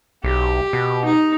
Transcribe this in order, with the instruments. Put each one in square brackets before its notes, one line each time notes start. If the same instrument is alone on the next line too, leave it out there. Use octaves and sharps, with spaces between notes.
[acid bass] B1 [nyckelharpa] G4
[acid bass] B2
[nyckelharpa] D#4